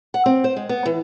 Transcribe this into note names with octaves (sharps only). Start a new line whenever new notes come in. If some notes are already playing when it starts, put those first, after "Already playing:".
F#5
C4
C5
G#3
B3
E3